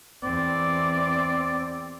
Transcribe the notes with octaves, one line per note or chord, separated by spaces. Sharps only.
E2 C4 D5